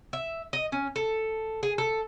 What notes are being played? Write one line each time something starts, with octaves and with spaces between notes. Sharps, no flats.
E5
D#5
C#4
A4
G#4
A4